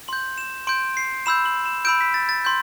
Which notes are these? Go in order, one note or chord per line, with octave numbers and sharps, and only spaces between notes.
C6 G6 F#7
E7
C6 G6 D7
C7
B5 E6 G6 E7
F#7
E7
B5 E6 G6 D7
B6
A6
A6
C6 G6